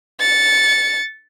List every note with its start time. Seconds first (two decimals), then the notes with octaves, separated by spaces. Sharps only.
0.20 A6 C#7